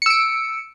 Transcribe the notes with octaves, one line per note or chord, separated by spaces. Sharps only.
E6 C#7 D7